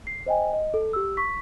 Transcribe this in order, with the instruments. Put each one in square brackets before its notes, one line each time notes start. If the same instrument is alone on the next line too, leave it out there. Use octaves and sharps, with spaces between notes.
[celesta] C7
C5 D#5 G5 G#5
D#5
A4
G4 E6
C#6 B6